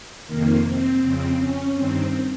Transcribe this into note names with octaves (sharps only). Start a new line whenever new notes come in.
F2 C3 D#3 A#3
C4
F2 C#3 C4
C#4
G2 D#3 C4